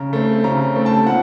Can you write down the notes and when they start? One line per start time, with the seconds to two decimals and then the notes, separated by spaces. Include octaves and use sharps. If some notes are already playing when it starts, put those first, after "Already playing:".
Already playing: C#3 A#5
0.13 A3 C4
0.44 C#3 A#5
0.76 A3 C4
0.86 A5
1.07 A#2 F#5